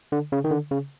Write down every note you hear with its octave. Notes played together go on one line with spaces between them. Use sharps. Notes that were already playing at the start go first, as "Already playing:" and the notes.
D3
C#3
D#3
D3
C#3